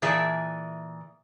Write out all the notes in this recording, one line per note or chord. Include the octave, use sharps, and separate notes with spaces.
A#2 E3 G#4 D5 E5 A5